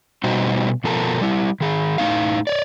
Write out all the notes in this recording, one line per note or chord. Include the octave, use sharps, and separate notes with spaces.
B2 G3 A3 D#4 F#4 C5
B2 F3 A4 A#4
G3 E4
D#3 G#4
A2 A3 A#3 D#4 F5
C#5 D5